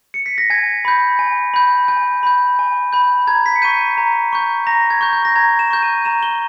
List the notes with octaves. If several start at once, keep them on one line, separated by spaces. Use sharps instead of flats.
C#7
B6
A#6
G#5 G#6
B5 G6
G#5
B5 G6
G#5 G6
B5 G6
G#5
B5 G6
A#5 G#6
B6
C#7
C#6 G6 D#7
A#5
C#6 G6
A#5 A#6
G#6
C#6 G6
G6
A#6
A#5 G#6
E7
C#6 G6
D#7
A#5 E7
G7